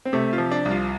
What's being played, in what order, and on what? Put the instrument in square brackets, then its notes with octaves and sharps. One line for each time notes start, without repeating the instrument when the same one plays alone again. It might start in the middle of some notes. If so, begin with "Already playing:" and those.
[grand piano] C4
C3 A3
F4
F3
D4
C2
F4